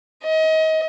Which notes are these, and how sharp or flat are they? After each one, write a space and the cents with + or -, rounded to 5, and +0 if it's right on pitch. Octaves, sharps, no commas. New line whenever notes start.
D#5 +30